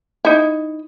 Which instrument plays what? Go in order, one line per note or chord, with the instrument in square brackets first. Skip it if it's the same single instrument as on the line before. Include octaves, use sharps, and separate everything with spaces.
[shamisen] D#4 E4